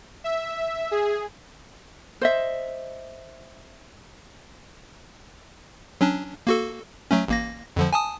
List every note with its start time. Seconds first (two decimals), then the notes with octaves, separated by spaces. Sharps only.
0.24 E5
0.91 G#4
2.21 C5 D#5 E5
6.01 F#3 C#4 D4
6.47 A#3 F#4 A4
7.11 F#3 A3 C#4
7.28 A1 A#3 A#6
7.76 F2 D3 F3
7.93 G#5 A5 D#6